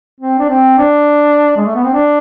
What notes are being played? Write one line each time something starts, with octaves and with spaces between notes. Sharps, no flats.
C4
D4
C4
D4
G#3
A3
B3
C4
D4